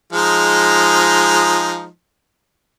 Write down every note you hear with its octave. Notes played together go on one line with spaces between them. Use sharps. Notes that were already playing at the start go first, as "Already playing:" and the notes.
F3 G#3 D#4